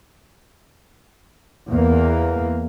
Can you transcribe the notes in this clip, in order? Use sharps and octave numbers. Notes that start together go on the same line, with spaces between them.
E2 A#3